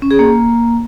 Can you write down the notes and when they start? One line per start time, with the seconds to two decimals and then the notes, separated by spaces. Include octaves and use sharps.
0.02 C#4
0.11 G#4
0.19 A#3